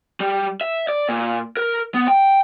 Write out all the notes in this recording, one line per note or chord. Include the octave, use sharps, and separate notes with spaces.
G3
E5
D5
A#2
A#4
B3
G5